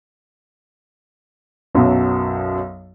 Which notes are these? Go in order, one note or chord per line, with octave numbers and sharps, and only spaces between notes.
B1 F#2 B2 F#3